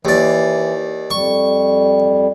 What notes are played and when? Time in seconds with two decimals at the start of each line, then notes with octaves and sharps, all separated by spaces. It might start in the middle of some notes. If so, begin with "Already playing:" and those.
0.05 D#2 E3 D5
1.11 F2 G3 C#6